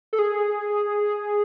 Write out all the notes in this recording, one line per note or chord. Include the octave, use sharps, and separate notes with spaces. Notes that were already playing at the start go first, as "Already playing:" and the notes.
A4
G#4